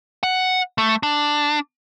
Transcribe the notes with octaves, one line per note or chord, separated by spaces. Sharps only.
F#5
A3
D4